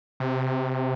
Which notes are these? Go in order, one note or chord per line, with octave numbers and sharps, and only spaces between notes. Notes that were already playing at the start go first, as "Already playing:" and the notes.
C3